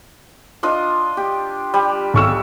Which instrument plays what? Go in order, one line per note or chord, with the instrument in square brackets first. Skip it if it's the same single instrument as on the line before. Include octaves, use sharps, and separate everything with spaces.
[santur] D4 F4 D#5
G4
G3
[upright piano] B1 C#6 E6